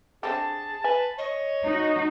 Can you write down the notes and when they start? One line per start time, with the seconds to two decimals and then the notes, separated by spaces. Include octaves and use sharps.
0.23 D3 C4 G4 G#4 A5
0.84 B4 G#5
1.18 C#5 D#5
1.63 D#4 F#4